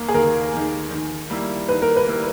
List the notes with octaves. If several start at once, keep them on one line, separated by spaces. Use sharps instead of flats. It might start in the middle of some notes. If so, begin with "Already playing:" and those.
Already playing: D#2 D#3 A#3
G#4
D#2 A#4
D#3 A#3
D#3
G3 A#3 E4
D#3 B4
A#4
B4
G3 A#3 E4